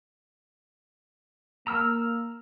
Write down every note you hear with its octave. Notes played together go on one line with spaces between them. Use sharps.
A#3 A#5 E6 F6